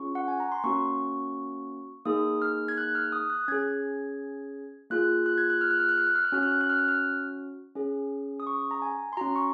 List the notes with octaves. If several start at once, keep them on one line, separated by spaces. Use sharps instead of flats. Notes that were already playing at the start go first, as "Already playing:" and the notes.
Already playing: C#4 F4 G#4 C#6
F#5
G#5
A#5
C6
A#3 C#4 F#4 C#6
A#3 D#4 G#4 D#6
F6
G#6
F#6
F6
D#6
F#6
C#4 G#4 G#6
A#3 F4 G#4 F#6
F#6
G#6
F#6
F6
F#6
F6
F#6
F6
F#6
F6
F#6
C#4 F#4 F6
F#6
F6
F#6
F6
F#6
F6
C#4 G#4
D#6
C#6
A#5
G#5
C6
C#4 F#4 A#5
C#6